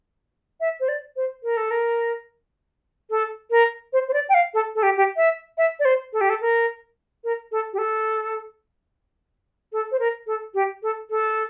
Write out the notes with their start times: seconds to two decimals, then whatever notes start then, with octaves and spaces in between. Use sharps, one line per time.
0.60 E5
0.80 C5
0.88 D5
1.16 C5
1.43 A#4
1.57 A4
1.71 A#4
3.10 A4
3.50 A#4
3.93 C5
4.08 C5
4.13 D5
4.29 G5
4.34 F5
4.54 A4
4.75 A4
4.83 G4
4.97 G4
5.16 E5
5.58 E5
5.79 D5
5.85 C5
6.13 A4
6.21 G4
6.29 A4
6.41 A#4
7.24 A#4
7.51 A4
7.73 G4
7.78 A4
9.72 A4
9.91 C5
9.99 A#4
10.27 A4
10.54 G4
10.83 A4
11.10 A4